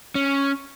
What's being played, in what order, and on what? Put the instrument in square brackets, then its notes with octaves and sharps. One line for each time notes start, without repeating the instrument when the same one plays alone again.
[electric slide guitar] C#4